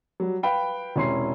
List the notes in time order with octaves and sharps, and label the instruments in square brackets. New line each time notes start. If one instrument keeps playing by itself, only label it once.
[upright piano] F#3 G3
B4 F5 G5 B5
E1 C3 C#4 E4 C6 C7